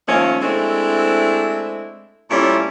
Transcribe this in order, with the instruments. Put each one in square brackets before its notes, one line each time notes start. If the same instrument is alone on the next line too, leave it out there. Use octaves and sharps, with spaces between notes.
[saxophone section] D#3 F3 A3 A#3 C#4
G#3 A3 C4 D4 E4
A#2 G3 A3 C#4 E4